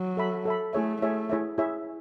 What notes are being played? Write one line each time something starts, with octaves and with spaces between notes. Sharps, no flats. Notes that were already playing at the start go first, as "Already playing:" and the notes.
Already playing: F#3
A4 E5 B5
A4 E5 B5
A3 E4 G#4 C#5 E5
A3 E4 G#4 C#5 E5
E4 G#4 C#5 E5
E4 G#4 C#5 E5